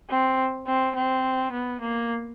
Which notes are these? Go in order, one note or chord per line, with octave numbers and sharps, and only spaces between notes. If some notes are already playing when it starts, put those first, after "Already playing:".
C4
C4
C4
B3
A#3